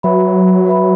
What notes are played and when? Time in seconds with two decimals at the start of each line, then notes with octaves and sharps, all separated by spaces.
0.03 F#3 F#4 B4 E5 B5
0.66 F#4 B4 E5 B5